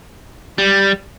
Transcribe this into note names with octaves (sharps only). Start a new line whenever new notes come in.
G3